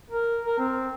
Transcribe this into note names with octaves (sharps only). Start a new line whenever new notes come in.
A#4
A#4
C4